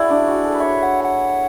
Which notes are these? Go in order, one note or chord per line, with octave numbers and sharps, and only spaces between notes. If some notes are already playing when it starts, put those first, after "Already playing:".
Already playing: E4 F#4 G#4 D5
D4
F#4
A4
B4
C#5 E5
F#5
F#5